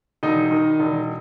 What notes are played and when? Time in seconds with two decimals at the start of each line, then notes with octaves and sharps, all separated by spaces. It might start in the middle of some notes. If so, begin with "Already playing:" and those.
0.23 E1 D#4 D#5
0.51 D#3
0.80 E1